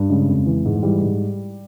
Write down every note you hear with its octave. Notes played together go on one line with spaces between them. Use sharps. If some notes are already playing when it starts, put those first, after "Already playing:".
Already playing: G2
C#3 G#3
F2
E3
G#2
G#3
E3 G3
G#2